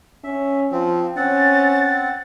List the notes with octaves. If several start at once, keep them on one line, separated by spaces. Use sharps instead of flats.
C#4 E5
F3 C4
C4 C#4 F#5 A6